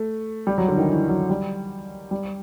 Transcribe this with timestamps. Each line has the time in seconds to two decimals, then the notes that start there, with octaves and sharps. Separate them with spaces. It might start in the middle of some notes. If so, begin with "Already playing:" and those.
Already playing: A3
0.47 G3
0.58 F#3
0.68 D3
0.78 D#3
0.89 E3
1.08 F#3
1.29 G3
2.11 G3